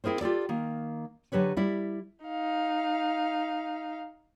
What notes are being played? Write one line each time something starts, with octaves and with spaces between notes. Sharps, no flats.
C4 E4 G#4 A#4 C5
F4 G4 A4 D5
D#3 A#3
D3 F#3 G4 B4 C#5
G3 E4 D5
D#4 F5